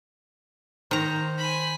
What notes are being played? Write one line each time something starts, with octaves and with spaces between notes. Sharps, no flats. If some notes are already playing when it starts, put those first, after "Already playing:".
D#3 C5 A#5
G#5 B5